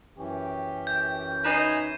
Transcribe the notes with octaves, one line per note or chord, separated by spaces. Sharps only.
F#2 E3 C#4 G4
G6
D#4 B4 G#5 C7 D#7 E7